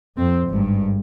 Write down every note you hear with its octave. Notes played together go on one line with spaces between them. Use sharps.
F2 C4
G#1 G2